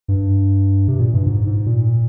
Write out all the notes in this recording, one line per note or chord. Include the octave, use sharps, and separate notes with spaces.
G2
C3
A#2
G2
G#2
G#2
A#2